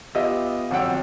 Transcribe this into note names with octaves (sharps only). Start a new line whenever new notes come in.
B3 F4 G4 D#5 E5
G1 F2 F#3 F#5 G5 E6